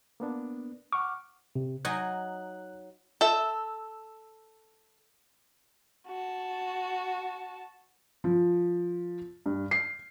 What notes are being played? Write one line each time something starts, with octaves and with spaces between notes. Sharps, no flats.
A#3 B3 D4
F#5 C#6 D6 F6
C3
F#3 D#4 G#5 F#6
A4 E5
F#4 A5
F3
G2
C7